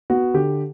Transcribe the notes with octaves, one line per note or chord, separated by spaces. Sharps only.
B3 F#4
D3 G4